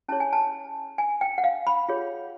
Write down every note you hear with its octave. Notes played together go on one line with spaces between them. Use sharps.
C#4 E4 G#4 C#5 A5
G#5
A5
G#5
G5
F#5
F5
B5
F4 G#4 C#5